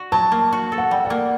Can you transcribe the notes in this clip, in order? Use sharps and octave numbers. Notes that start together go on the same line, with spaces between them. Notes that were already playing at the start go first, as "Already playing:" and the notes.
Already playing: F#4
F#3 A5
A#3
F#4
A4
F#5
G3
F#5
A#3